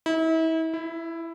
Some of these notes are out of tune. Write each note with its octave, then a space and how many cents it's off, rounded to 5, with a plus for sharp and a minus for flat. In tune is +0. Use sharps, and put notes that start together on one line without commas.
E4 -35
E4 +10